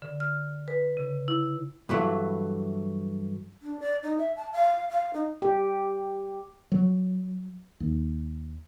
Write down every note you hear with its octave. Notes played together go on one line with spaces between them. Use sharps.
D3
F6
B4
C#3
E4
G2 E3 F#3 A3
D4
D5
D#4
E5
A5
F5
F5
D#4
G4
F#3
D#2